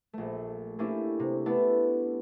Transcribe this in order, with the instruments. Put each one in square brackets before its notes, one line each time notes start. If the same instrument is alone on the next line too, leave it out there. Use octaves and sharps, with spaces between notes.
[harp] A#1 A3
A3 A#3 C#4 D4 E4 G4
C3
A3 B3 D4 E4